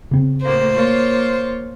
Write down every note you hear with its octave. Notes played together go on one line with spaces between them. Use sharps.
C#3 C4
D2 A2 A#3 C5
A#3 F4 C#5